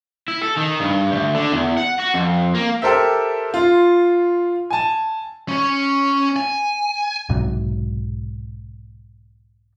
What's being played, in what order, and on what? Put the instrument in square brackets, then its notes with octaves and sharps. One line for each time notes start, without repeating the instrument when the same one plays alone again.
[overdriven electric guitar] E4
A4
D#3
G2
D2
D3
E2
F#5
F#4
F2
A#3
[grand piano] G4 A4 A#4 C5 E5
F4
G#5 A5
[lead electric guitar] C#4 C#5
G#5
[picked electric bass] B1 G#2 C3 F#3